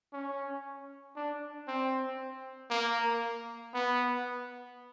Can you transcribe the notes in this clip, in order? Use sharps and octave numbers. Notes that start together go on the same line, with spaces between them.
C#4
D4
C4
A#3
B3